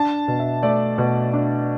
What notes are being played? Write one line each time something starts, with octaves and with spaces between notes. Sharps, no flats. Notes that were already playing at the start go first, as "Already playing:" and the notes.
Already playing: D4 A5
B2
E5
A3 D5
B2
D4